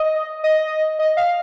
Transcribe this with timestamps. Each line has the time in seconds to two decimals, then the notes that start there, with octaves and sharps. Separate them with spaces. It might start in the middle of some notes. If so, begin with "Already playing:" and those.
Already playing: D#5
0.44 D#5
0.99 D#5
1.17 F5